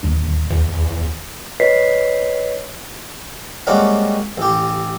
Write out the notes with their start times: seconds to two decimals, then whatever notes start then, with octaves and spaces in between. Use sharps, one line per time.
0.03 D1 D#2 D4
0.50 E2
1.60 B4 C#5 D#5 B6 C7
3.67 G3 G#3 A#3 C4 C#4 F#4
4.37 A1 G4